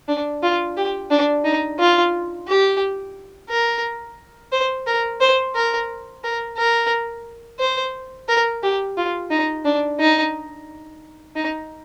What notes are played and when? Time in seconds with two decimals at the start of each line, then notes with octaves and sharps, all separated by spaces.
0.08 D4
0.43 F4
0.77 G4
1.11 D4
1.44 D#4
1.79 F4
2.48 G4
3.49 A#4
4.52 C5
4.86 A#4
5.20 C5
5.55 A#4
6.24 A#4
6.57 A#4
7.59 C5
8.28 A#4
8.63 G4
8.97 F4
9.31 D#4
9.65 D4
9.99 D#4
11.35 D#4